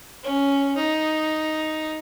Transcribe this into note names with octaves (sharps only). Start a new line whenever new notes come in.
C#4
D#4